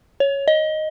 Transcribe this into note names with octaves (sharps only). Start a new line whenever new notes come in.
C#5
D#5